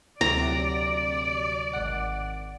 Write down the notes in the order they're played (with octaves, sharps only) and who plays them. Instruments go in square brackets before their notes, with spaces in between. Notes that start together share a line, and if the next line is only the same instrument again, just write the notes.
[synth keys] D2 C3 F#3 [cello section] D5 [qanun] A#5
[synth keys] G#1 F#5